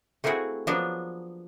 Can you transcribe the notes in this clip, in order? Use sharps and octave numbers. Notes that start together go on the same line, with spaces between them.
A3 A#3 C4 E4 F#4 G#4
F3 F#3 A#3 B3 D4